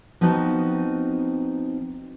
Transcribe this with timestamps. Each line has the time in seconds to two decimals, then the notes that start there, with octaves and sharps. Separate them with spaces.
0.21 F3 B3 C4 D#4 F#4